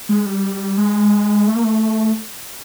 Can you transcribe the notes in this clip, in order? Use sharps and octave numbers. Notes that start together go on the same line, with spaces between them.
G#3
G3
G#3
A3
A#3
A3